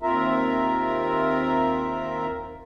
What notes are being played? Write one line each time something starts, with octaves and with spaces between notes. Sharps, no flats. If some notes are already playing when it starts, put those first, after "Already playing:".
D#2 C4 F4 A#4 E5 A#5